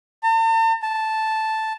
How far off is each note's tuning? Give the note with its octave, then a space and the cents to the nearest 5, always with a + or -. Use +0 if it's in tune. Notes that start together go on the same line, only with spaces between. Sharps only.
A5 +45
A5 -5